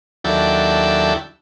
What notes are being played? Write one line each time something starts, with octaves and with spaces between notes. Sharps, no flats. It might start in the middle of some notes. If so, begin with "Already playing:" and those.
D#2 F#3 D4 E4 A4 G5